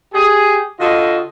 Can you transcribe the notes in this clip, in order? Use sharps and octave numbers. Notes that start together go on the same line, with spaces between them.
G4 G#4
D3 F4 F#4 D#5